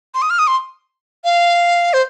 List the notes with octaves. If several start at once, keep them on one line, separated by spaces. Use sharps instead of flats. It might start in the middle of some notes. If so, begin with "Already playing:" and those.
C6
D#6
F6
D#6
C6
F5
C5